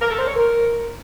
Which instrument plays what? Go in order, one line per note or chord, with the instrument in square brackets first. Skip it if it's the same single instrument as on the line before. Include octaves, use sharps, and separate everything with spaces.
[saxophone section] A#4
A4
C5
C#5
A#4